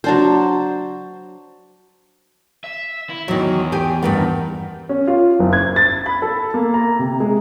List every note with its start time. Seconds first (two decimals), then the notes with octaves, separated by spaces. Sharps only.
0.04 F#3 D4 C5
2.64 E5
3.10 E4
3.28 E2 D#3 F#3
3.72 G4 G5 G#5
4.03 G2 D#3 B3
4.89 C#4
5.07 F4
5.40 F#1
5.53 G#6
5.76 A6
6.06 B5
6.22 A4
6.54 A#3
6.74 A#5
6.99 C3
7.20 G#3